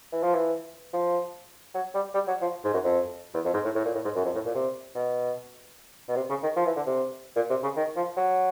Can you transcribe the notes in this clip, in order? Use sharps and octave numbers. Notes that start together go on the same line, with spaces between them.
E3
F3
E3
F3
F#3
G3
G3
F#3
F3
G#2
F#2
F2
E2
F2
G#2
A2
A2
A#2
A2
G#2
F#2
F2
A2
A#2
C3
B2
B2
C3
C#3
D#3
F3
E3
D3
C3
A#2
C3
C#3
D#3
F3
F#3